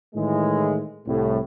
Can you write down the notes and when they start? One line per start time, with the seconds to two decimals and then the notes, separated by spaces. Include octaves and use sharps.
0.15 A2 D#3 E3 G#3
1.06 C2 A2